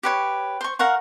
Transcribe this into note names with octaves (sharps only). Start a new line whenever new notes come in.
G4 B4 C#5
C5 C#6
A#4 F5 F#5 C#6